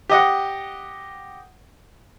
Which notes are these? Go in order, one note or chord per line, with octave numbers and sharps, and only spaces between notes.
G4 D#5 F#5